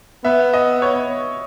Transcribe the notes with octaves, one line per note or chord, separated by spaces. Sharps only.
B3 E5
D#5
C#5